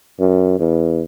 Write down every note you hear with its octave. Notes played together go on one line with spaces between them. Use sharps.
F#2
E2